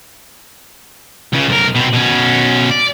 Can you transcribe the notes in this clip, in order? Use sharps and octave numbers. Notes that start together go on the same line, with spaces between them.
C#2 C#3
B1 A#4
B2 C4
B2 C#4
D5